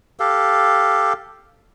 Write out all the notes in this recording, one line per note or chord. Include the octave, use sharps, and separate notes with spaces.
G4 A4 F5